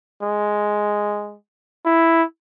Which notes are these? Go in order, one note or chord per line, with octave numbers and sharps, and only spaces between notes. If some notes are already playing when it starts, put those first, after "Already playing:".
G#3
E4